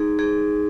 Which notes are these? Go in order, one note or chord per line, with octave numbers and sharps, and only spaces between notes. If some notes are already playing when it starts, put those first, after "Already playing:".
Already playing: D#4 G#4
G#4